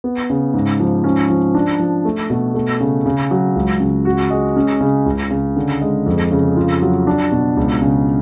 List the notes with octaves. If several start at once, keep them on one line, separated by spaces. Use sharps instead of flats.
B3
C#3
G#2
F3
C#4
F3
D4
F3
A3
B2
A3
C#3
C#3
F#3
C#2
C#3
F#4
G#3
C#4
C#3
C#2
C#3
D3
G#3
F2
C#3
F4
F#3
D4
B2
C#2
C#3